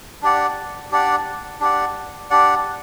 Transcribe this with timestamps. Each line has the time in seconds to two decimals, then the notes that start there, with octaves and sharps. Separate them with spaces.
0.22 D4 G4 D5 F#5
0.92 D4 G4 D5 F#5
1.60 D4 G4 D5 F#5
2.30 D4 G4 D5 F#5